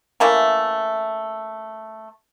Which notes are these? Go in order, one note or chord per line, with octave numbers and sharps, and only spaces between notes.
E3 A3 A#3 C#4